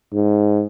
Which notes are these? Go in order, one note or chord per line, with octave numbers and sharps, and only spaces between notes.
G#2